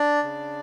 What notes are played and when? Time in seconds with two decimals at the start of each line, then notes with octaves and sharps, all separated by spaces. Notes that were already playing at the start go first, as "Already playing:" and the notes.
Already playing: D4 D5
0.23 C#3